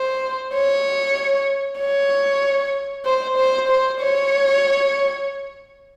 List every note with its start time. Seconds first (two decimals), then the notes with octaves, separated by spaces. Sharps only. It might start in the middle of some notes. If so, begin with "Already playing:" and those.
Already playing: C5
0.54 C#5
1.80 C#5
3.05 C5
3.37 C5
3.69 C5
4.00 C#5